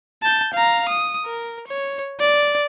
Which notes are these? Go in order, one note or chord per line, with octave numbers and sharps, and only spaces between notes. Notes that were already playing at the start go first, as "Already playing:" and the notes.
A5 G6
F5 A#5
D#6
A#4
C#5
D5